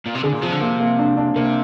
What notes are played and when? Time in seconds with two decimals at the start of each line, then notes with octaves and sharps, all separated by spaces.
0.06 A#2
0.15 C3
0.23 D3 G#4
0.33 A#2
0.42 C3 F3
0.51 D3
0.61 C3 A#3
0.80 A#3
0.99 D4
1.17 D4
1.36 C3 A#3